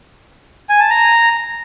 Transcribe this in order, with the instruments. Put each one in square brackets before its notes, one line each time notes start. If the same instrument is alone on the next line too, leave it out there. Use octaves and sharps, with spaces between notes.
[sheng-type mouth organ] G#5
A5
A#5